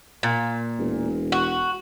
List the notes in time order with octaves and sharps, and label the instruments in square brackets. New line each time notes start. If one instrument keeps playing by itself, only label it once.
[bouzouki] A#2
[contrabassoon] E1
[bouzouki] F#4